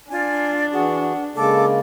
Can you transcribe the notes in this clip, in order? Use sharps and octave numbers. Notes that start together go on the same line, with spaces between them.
D4 F4 D5 G#5
E3 F#4 G#4 F#5
C#3 G#3 A#3 A4 D6